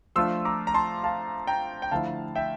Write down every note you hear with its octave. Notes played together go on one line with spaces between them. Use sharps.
F3 A3 D4 F4 C6 E6
A#5 D6
A#5
A5 C6
F5 A5
G5 A#5
G5
D3 F3 A3 E4 F5 A5
E5 G5